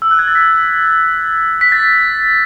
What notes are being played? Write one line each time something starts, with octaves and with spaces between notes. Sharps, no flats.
E6
F#6
G#6
A6
B6
B6
A6